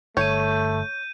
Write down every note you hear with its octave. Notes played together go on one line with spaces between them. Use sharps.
G1 A3 C#5 G6 D#7